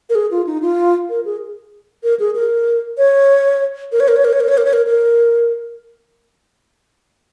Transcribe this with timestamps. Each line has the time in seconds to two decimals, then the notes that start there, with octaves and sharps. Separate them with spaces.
0.10 A#4
0.15 G#4
0.31 F4
0.47 D#4
0.62 F4
1.10 A#4
1.25 G#4
2.04 A#4
2.19 G#4
2.35 A#4
2.98 C#5
3.92 A#4
4.00 C#5
4.08 A#4
4.16 C#5
4.25 A#4
4.33 C#5
4.40 A#4
4.48 C#5
4.58 A#4
4.65 C#5
4.73 A#4
4.86 A#4